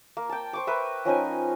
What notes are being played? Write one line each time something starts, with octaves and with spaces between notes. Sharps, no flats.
A#3
G5 A5
C5 C#6 D6
A#4 B4 E5
F3 C#4 D#4 G#5